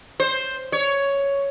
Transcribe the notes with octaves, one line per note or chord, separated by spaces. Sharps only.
C5
C#5